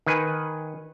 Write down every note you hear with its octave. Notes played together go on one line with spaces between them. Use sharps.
D#3 B4 G#5